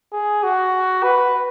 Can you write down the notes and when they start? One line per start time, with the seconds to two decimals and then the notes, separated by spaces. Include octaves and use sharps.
0.13 G#4
0.43 F#4
1.04 B4